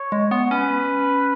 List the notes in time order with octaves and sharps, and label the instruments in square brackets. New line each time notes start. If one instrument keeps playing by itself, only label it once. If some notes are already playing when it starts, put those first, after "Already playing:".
Already playing: [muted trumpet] C#5
[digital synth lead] G#3
B3
[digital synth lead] C#4 [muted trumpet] B4